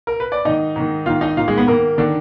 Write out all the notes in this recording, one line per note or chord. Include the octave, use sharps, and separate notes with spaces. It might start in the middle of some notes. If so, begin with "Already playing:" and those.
A#4
B4
D5
G#2 D#3 D#4 D#5
G#2 D#3
G#2 D#3 F4 F5
D#4 D#5
G#2 D#3 F4 F5
G#3 G#4
B3 B4
G#2 D#3 A#3 A#4
D3 D#3 D4